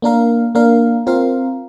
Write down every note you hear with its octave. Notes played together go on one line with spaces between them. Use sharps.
A#3 D4 A#4 F5
A#3 D4 A#4 F5
C4 F4 A#4 F5